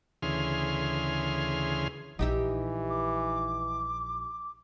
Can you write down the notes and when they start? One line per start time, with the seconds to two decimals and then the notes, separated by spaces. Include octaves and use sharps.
0.22 D2 C#3 E3 G#4 C6 F6
2.19 A#1 E3 G3 D#4 G4 E5
2.90 D6